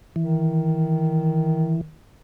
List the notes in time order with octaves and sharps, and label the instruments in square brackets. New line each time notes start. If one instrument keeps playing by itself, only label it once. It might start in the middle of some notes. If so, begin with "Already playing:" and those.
[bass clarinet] D#3 [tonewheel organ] E3